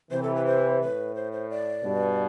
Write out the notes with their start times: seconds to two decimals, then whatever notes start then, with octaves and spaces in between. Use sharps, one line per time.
0.11 C3 E3 C5
0.23 A4
0.35 B4
0.46 C5
0.81 A2 B4
1.15 C5
1.32 C5
1.50 D5
1.84 G2 B2